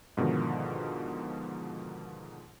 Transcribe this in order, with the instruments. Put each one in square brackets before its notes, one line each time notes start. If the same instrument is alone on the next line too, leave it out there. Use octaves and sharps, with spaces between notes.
[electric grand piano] G#2 B2 D3 D#3 F3